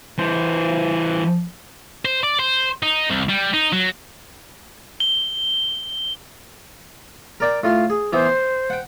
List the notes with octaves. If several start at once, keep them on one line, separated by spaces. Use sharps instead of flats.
E3 C5
C5
D5
C5
D#4
C2
G3
D#4
F#3
G7
A#4 D5 G5
A2 F4 C6
G#4
E3 B3 C5
C6
F#5 G5